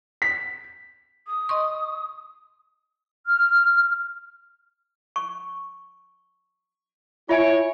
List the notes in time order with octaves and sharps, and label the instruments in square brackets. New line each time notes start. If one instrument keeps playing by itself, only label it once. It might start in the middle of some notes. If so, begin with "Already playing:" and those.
[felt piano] B6
[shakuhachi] D#6
[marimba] D#5 C6 C#6
[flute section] F6
[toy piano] C#6
[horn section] E4 C#5 [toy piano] F4 E5 G#5